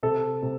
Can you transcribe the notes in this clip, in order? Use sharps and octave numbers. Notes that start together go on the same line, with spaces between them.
C3 A4
C3